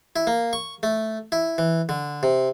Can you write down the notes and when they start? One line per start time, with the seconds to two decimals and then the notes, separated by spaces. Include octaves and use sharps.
0.16 E4
0.27 A#3
0.53 C#6
0.83 A3
1.32 E4
1.58 E3
1.89 D3
2.23 C3